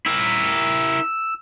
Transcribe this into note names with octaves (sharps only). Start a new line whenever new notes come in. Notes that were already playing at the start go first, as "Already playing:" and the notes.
E4 A#4 E6